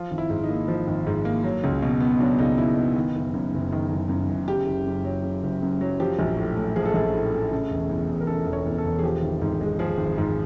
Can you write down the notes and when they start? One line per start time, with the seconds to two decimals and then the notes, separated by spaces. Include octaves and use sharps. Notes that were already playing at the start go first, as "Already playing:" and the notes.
Already playing: F3 F4
0.11 G#1
0.18 E4
0.30 G#2
0.44 D#4
0.49 A#3
0.68 F3
0.87 G#1
1.07 G#2
1.25 A#3
1.44 F#3
1.64 C#2
1.82 B2
2.01 B3
2.20 F#3 D4
2.38 C#2 D#4
2.58 B2 E4
2.77 B3
2.96 D#3
3.15 F#1
3.34 F#2
3.54 F#1
3.72 D#3
3.92 F#1
4.09 F#2
4.29 F#1
4.48 C#3 G4
4.66 F#1
4.86 F#2
5.04 F#3
5.23 C#3
5.43 F#1
5.62 F#2
5.81 F#3
6.00 F3 G4
6.19 A#1
6.37 A2
6.57 A3
6.76 F3 G#4
6.85 A4
6.94 A#1 G#4
7.14 A2
7.33 A3
7.51 C#3
7.70 E1
7.89 E2
8.09 E1
8.21 A#4
8.27 C#3 A4
8.46 E1
8.53 C#5
8.66 E2
8.78 A4
8.85 E1
8.99 G#4
9.03 F3 G4
9.22 G#1
9.42 G#2
9.61 G#3
9.79 F3 G#4
9.98 G#1
10.18 G#2